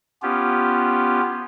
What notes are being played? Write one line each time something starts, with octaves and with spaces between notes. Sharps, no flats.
B3 C#4 F4 G4